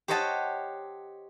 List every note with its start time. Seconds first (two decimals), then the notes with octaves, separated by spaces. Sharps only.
0.08 G4 C5 C#5 D#5 F#5 A5